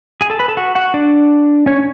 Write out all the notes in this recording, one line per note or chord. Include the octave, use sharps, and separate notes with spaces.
G#4 G#5
A4 A5
B4 B5
A4 A5
F#4 F#5
F#4 F#5
D4 D5
C#4 C#5